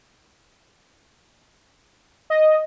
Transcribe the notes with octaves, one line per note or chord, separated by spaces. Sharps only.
D#5